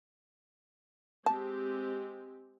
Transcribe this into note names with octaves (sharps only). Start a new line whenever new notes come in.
G#3 C4 G4 A5